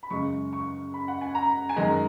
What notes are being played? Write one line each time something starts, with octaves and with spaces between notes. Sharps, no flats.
B5
F#2 C#3 G#3 C#6
C#6
B5
F#5
G#5
A#5
G#5
F#2 D#3 G#3 A#5